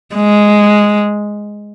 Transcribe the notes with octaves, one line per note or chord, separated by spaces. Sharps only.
G#3